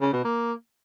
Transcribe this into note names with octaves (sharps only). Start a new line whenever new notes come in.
C#3
B2
A#3